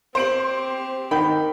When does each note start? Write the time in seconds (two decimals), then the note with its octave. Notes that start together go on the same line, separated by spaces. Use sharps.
0.15 C4 G4 C5 D7 F#7
1.11 D#3 G5 B5